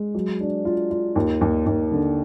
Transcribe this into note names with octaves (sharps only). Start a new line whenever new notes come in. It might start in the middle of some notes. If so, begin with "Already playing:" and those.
Already playing: G#3
F#3
D4
F4
F4
D#2
D#2
D#2
D3